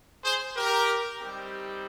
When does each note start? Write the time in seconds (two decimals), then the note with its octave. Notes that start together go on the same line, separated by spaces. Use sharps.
0.24 G#4 C5
0.56 G4 A#4
1.19 G3 C4 D#4 G4